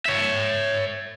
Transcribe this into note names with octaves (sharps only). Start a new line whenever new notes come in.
C#5 E5